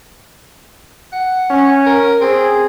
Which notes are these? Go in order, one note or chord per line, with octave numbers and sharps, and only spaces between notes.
F#5
C#4
A#4
C4 G#4